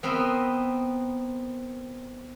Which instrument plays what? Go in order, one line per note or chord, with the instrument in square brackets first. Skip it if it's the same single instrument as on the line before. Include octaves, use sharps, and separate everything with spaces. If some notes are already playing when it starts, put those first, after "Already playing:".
[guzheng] B3 C4 A#4 D#5 E5